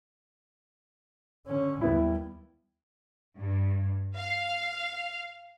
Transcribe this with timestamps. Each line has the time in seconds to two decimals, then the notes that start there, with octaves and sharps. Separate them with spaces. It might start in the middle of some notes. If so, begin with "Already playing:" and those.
1.47 D3 C#4
1.81 D#2 G3 B3 E4
3.38 G2
4.15 F5